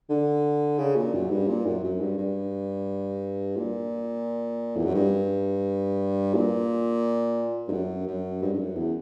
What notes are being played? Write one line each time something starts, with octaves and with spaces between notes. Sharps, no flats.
D3
C#3
A#2
F#2
G2
A#2
F#2
F#2
G2
G2
A#2
E2
F#2
G2
A#2
G2
F#2
F#2
G2
G2
F#2
E2